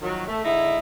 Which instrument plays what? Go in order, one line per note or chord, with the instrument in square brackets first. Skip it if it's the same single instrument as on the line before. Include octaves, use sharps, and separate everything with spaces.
[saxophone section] D#3 F3 F#3
A3
D3 G#3 D#4 E4